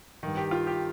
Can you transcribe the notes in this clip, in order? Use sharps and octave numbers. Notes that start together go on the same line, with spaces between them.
G2 D#3
G4
F4
G4